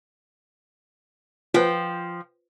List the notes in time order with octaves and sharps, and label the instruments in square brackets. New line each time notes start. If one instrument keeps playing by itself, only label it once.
[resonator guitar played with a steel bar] F3 G5 [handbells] F4 B4 C5